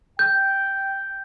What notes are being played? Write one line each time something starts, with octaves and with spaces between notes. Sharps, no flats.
G5 G6